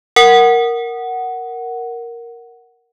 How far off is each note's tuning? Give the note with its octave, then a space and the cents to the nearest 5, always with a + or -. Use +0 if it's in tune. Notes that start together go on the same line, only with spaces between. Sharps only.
A#4 +0 F#5 +5